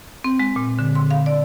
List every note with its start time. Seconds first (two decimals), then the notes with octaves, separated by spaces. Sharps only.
0.24 C4
0.39 G#3
0.56 A#2
0.79 D3
0.95 C6
1.11 F5
1.26 D5